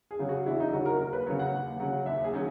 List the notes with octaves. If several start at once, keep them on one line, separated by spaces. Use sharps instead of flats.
G#4
C#3 F#3
F#4
E2 E4
D#4
C#3 F#3 F#4
A#4
D#2 A#4
B4
C#3 F#3 C#5
F#5
D#2
C#3 F#3
D#2 E5
G#4
D#3 F#3 C#4